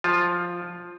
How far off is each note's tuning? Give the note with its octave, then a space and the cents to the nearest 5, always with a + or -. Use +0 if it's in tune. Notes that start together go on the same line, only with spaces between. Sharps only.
F3 +5 F4 +5